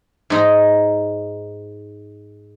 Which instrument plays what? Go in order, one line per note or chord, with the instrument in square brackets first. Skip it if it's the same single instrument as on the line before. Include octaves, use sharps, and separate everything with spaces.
[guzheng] G#2 D#4 A#5